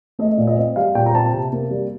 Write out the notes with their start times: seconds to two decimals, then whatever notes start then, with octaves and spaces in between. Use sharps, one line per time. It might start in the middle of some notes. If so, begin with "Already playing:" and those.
0.19 A3 D#5
0.38 A#2
0.47 D#5
0.57 C4
0.76 G3 F5
0.95 A#2 G5
1.06 A#5
1.14 C4 A5
1.33 C3
1.52 A#3
1.71 G3